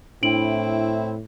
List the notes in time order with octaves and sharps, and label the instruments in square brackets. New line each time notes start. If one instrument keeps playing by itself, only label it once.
[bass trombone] A2 [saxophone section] C4 E4 [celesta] D4 D7 F#7